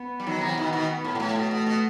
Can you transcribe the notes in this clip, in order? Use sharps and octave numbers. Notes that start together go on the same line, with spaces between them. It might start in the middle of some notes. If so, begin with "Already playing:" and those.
Already playing: B3
G3
D#3 F#3
C3 E3
B2 D#3
B2 D#3
B3
A2
B2
A2 A3
B2
B2 A3
B2